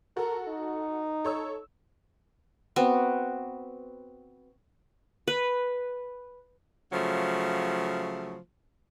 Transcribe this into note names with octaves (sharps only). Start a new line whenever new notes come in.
F#4 A4 A#4
D#4
A4 C#5 E6
B3 C4 F#4
B4
C#3 F3 F#3 A3